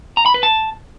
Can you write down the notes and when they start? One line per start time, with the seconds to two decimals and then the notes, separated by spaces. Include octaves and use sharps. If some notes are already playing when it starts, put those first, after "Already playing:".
0.17 A#5
0.26 B5
0.34 B4
0.43 A5